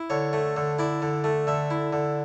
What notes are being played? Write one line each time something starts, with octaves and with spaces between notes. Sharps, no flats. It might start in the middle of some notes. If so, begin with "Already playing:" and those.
Already playing: E4
D3 C#5
A3
D3
E4 D5
D3
A3
D3 E5
E4
D3